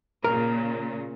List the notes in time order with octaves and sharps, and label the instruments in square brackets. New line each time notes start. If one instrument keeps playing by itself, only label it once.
[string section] A#2 C#3 [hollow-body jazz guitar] A#4